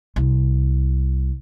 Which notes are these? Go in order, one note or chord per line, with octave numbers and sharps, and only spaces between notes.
C2